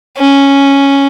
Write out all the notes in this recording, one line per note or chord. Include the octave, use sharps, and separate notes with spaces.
C#4